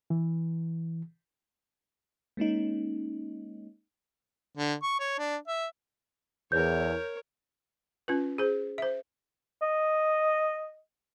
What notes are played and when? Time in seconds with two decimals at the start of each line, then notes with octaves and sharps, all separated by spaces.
0.10 E3
2.37 G#3 A#3 C#4 D#4
4.56 D3
4.83 C#6
5.00 C#5
5.18 D4
5.48 E5
6.52 E2 A#4 C#5 G6
8.08 C#4 F4 B4
8.38 G#4 C5
8.78 C5 E5
9.62 D#5